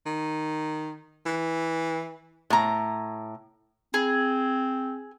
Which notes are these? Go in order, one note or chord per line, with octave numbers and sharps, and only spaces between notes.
D#3
E3
A2 A#5
C4 G#4